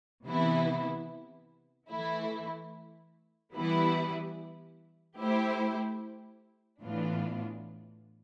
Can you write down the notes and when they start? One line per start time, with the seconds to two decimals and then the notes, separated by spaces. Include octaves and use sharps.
0.24 C3 E3 B3 E4
1.89 E3 A3 E4
3.53 E3 G3 B3 E4 B4
5.18 A3 E4 G4 C5
6.82 A2 E3 B3 D4 F4